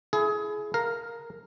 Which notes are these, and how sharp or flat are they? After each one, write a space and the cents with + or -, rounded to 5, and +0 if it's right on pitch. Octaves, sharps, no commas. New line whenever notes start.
E4 +20 G#4 +25
A#4 +0 F5 +10